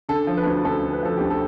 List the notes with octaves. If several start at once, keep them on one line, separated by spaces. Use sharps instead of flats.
D3 A4
F3
B4
D2
D2 A4
D3
B4
F3 A4
D2 G4
A4